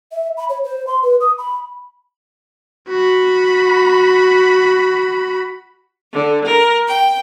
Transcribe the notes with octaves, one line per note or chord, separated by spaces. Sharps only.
E5
B5
C#5
C5
C6
B4
D#6
B5
F#4 B5
D3
A#4
G5